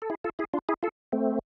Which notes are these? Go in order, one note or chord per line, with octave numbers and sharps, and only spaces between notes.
A4
E4 G#4
F4 A4
E4 G#4
D4 F4
E4 G#4
F4 A4
A3 C4